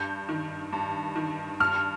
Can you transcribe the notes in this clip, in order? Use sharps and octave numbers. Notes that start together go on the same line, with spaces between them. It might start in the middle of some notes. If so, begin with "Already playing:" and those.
Already playing: G2 G6
D#3
G2
D#3
G2 F6